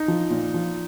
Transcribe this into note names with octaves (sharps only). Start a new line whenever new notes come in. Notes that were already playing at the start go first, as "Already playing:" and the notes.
Already playing: D#4
F3
A#2
F3